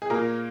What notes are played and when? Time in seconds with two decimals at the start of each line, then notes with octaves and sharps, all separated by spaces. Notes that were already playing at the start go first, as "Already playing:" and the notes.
0.02 G#4
0.10 A#2 A#3 A#4